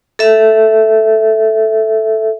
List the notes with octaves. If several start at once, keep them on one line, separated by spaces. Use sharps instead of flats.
A4 E5